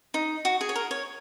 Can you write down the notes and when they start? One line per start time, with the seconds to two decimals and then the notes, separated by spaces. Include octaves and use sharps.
0.14 D#4
0.45 F#4
0.61 G#4
0.69 C#5
0.76 A#4
0.91 C#5